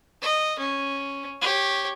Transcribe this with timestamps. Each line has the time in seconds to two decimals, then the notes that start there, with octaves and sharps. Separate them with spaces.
0.22 D#5
0.59 C#4
1.42 G4 C#5